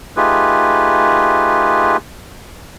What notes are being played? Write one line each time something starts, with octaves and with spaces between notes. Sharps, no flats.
A3 D#4 F4 G4 G#4 B4